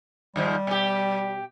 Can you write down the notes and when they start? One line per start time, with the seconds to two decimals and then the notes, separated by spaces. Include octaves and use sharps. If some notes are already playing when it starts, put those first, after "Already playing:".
0.36 D#2 G#2 F3 G3
0.67 B2 G4